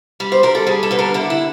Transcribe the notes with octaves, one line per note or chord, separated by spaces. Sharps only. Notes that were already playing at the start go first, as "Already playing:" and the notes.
G3
C5
G3 A#4
A4
G3 G#4
A4
D3 B4
A#4
D3 E4
E4